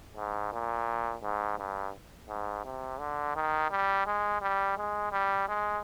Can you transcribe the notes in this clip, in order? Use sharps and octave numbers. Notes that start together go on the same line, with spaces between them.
G#2
A#2
G#2
G2
G#2
C3
D3
D#3
G3
G#3
G3
G#3
G3
G#3